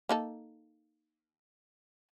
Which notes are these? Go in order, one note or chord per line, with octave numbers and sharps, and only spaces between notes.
A#3 D#4 A4